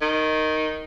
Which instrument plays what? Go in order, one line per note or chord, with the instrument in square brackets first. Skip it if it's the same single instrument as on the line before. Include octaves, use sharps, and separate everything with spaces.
[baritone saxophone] D#3